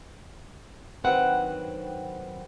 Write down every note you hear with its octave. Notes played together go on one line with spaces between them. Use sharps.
G2 D#3 F#3 C4 B4 F#5